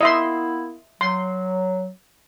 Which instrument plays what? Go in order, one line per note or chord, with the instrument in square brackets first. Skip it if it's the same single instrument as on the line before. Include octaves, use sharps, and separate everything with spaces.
[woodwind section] A#3 B3 E4 [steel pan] D#5 E5 C6
[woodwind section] F#3 [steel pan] C6